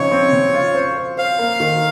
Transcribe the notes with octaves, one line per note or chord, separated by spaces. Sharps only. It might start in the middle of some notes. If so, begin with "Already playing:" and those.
Already playing: C#3 F3 C4 D#4 C#5
C4
C#3
F4
C5
C5
C5 F5
A#3
D#3